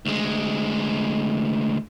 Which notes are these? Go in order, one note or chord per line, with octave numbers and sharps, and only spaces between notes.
D2 G#3